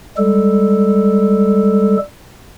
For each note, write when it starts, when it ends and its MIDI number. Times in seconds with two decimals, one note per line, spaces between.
0.17 1.97 55
0.17 1.97 56
0.17 1.97 69